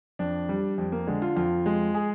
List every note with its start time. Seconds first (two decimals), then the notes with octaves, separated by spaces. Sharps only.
0.19 F2 D4
0.49 G3
0.78 F2
0.92 A#3
1.07 D3 G#3
1.22 F4
1.36 F2 F4
1.66 G#3
1.94 G#4